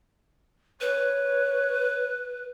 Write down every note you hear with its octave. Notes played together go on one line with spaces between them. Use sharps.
B4 C#5